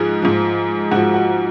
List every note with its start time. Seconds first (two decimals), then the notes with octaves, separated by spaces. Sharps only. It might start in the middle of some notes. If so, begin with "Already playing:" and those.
Already playing: G#2 F3 G#4
0.22 G#2 F3
0.91 G#2 F3 F#4
1.14 F#4